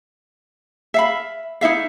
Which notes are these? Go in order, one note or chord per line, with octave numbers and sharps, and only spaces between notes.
E5 F5 B5
D#4 E4 E5 F5